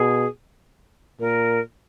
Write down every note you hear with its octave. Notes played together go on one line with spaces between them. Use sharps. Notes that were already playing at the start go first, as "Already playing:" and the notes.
Already playing: B2 G#4
A#2 A#4